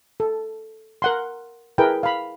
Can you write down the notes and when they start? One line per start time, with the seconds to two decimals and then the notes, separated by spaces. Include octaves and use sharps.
0.20 A4
1.02 A#4 F#5 C6
1.78 E4 G#4 A#4 B4 G5
2.03 F5 B5